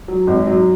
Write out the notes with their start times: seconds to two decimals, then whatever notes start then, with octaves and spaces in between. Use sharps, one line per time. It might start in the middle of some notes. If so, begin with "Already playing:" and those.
0.08 F#3
0.27 G#1
0.47 F#3